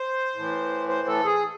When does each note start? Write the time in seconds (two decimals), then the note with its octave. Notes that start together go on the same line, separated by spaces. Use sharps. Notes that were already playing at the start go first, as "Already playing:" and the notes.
Already playing: C5
0.35 A2 E3
0.89 C5
1.08 A4
1.25 G#4